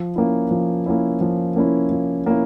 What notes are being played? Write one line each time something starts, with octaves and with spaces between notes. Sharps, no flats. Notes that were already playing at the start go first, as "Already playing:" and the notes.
Already playing: F3
A#3 C#4 E4
F3
A#3 C#4 E4
F3
A#3 C#4 E4
F3
A#3 C#4 E4